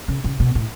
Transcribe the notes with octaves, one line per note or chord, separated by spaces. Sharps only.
C#3
C#3
B2
A2